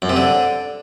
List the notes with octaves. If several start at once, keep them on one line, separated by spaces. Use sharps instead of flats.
F#2
C3
D3